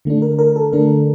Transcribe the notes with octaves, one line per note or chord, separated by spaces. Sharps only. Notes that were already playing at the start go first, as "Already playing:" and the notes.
D3 A3 D4
A#4
A#4
A4
D3 A3 D4 A#4